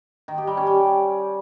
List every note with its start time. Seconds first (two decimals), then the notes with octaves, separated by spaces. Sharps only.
0.28 D#3
0.38 G4
0.47 G3
0.57 C#4
0.67 G3